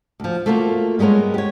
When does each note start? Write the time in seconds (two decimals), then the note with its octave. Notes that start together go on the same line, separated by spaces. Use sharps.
0.20 D2 F3
0.46 A3 A#3 F4 F#4 A#4
0.99 G3 G#3 B3 A#4 C#5
1.34 G4 C#5